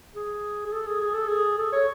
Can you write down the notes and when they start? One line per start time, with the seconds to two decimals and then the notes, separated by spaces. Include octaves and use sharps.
0.15 G#4
0.66 G#4
0.72 A4
0.87 G#4
1.01 G#4
1.14 A4
1.29 G#4
1.58 A4
1.73 C#5